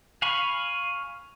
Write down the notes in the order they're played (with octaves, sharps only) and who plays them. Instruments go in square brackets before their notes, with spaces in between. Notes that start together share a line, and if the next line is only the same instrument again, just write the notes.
[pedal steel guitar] F5 G#5 B5 C#6